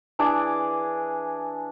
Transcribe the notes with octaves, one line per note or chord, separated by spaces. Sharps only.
E3 D4 G#4 D6